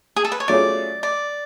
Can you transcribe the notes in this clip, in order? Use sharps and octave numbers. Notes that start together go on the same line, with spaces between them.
G#4
A4
B4
C#5
F#3 A3 C#4 F4 G#4 D5
D5